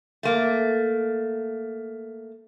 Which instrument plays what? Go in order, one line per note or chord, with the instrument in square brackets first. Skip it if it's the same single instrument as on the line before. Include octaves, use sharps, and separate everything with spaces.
[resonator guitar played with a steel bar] A3 A#3